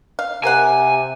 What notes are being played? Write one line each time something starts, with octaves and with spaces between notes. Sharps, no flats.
F5
C3 A#4 C5 F#5 G#5